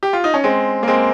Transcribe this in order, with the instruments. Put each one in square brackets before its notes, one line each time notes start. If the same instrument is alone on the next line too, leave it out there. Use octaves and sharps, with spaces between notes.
[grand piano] G4
F4
D#4
C#4
G#3 C4
A#3
G#3 C4